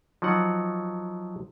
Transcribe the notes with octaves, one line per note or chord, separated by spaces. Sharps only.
F3 F#3 D#4 F#5